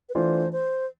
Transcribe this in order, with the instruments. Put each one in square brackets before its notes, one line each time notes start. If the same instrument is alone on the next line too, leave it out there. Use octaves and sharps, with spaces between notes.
[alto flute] B4
[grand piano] E3 A3 D4 F4 [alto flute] C5
[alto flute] C5